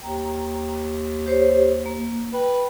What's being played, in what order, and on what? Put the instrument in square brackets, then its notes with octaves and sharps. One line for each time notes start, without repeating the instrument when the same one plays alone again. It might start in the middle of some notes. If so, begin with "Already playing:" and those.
[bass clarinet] D#2 [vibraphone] G5 A#5
[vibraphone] G4 C5 C#5
A#3
[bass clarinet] B4 [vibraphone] G5